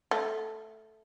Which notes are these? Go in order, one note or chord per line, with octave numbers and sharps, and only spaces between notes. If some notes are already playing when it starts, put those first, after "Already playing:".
A3